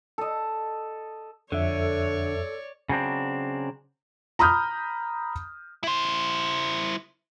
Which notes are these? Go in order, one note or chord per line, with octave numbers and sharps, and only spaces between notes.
A4 D#5
F2 D3 A4 C#5 D5 E5
C#3 F#3 C4 D4
A#5 B5 D#6 F6 G6
E4 C5